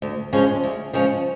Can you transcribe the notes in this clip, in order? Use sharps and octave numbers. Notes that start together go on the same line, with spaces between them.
D2
C#3 F3 G#3 C#4
D2
C#3 F3 G#3 C#4